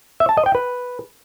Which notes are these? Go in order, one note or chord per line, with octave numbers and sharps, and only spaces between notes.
E5
A5
D#5
G5
B4